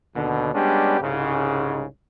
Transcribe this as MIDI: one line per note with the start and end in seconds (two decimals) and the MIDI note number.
0.15 0.51 39
0.15 0.51 47
0.15 0.51 50
0.55 0.98 55
0.55 0.98 56
0.55 0.98 59
0.55 0.98 61
0.55 0.98 62
0.55 0.98 67
1.01 1.85 36
1.01 1.85 44
1.01 1.85 49